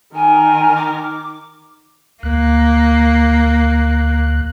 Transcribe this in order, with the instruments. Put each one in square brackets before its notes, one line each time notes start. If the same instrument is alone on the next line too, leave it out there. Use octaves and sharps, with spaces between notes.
[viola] D#3 A#4 [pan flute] G#5
[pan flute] D6
[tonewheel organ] D2 F#6 [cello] A#3